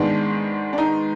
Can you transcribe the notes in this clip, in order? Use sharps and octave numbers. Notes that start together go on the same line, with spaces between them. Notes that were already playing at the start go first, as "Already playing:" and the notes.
Already playing: G#2 D#3 G#3 B3 D4
D4
D#4